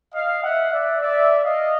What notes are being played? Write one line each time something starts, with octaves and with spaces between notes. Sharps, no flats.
D#5 F5
E5 F#5
D5 E5
D5 E5
D#5 F5